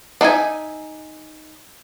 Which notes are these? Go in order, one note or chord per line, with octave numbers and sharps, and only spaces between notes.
D4 D#4 E5 G#5